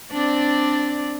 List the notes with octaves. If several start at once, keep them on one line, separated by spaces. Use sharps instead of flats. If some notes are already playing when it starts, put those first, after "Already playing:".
C4 D4 D5